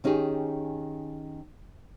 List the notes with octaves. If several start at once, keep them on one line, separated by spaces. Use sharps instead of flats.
D#3 C#4 D#4 G4 G#4